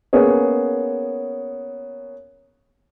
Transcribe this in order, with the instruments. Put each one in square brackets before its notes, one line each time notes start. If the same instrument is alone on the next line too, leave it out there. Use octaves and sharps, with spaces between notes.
[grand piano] A#3 B3 C#4 G#4 C#5